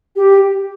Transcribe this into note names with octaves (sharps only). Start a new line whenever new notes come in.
G4